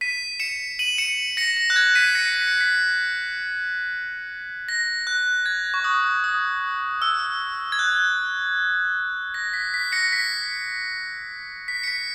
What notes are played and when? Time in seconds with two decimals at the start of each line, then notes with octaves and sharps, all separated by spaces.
0.01 B6 D#7
0.40 C#7 E7
0.79 D#7 F#7
0.98 C#7 E7
1.37 A#6 C#7
1.57 A#6
1.70 F#6
1.76 G#6
1.95 B6 D#7
2.15 A#6 C#7
2.34 B6
2.47 C#7
2.61 B6
4.69 A#6
5.07 F#6
5.46 G#6
5.74 C#6
5.84 D#6
6.24 D#6
7.02 E6
7.72 G#6
7.79 F#6
9.34 A#6
9.53 B6
9.74 B6
9.92 A#6 C#7
10.12 B6
11.68 B6
11.83 C#7
11.88 B6